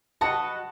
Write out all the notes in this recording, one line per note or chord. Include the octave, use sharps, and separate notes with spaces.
F#4 B4 D#5 F#5 A5